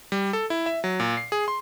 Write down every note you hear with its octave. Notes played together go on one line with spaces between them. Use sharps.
G3
A4
E4
E5
F#3
A#2
C7
G#4
C6